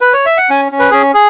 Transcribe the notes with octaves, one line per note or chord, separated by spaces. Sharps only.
B4
C#5
E5
F#5
C#4 G#5
C#4
B4
C#4 G#4
G#4